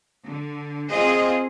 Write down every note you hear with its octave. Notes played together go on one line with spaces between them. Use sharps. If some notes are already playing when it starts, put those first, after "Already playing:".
D3
C4 F4 G#4 C5 D#5